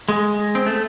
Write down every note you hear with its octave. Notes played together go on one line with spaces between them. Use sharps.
G#3
C4
A3